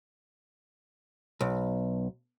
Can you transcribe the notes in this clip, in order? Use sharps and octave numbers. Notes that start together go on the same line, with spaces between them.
B1